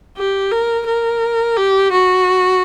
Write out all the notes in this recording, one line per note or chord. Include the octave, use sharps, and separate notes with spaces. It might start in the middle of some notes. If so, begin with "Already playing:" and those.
G4
A#4
A#4
G4
F#4